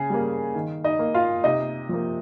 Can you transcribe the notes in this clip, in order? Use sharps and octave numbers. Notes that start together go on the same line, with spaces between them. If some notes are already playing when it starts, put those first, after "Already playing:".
Already playing: C#3 G#4
G3 A#3
D#3
D#4 D#5
A#3
F4 F5
C3 D#4 D#5
F3 A#3